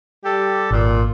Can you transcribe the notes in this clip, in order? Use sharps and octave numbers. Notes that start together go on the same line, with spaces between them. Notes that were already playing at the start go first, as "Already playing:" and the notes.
G3 G4 A4
G#1 A#2